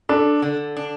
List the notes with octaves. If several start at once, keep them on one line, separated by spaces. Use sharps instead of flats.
D4 A4
D3
D4